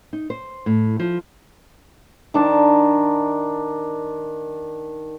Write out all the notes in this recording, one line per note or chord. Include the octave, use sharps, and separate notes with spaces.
D#4
C5
A2
F3
D#3 D4 A5